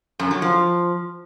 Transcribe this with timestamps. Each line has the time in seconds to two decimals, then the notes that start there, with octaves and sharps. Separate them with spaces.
0.19 F#2
0.31 F#3
0.42 F3